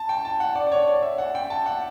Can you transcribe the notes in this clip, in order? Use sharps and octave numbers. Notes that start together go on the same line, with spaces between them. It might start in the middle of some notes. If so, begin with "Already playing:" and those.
Already playing: A5
G5
A5
F#5
D5
D5
C#5
D5
E5
F#5
G5
A5
F#5